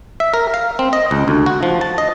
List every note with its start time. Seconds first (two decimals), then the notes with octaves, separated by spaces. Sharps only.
0.20 E5
0.34 A#4
0.54 F5
0.79 C4
0.93 D#5
1.11 C#2
1.28 D2
1.46 F#4
1.63 F3
1.81 A5
1.98 D#5